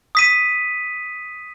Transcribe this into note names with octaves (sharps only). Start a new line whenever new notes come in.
D#6 B6 D#7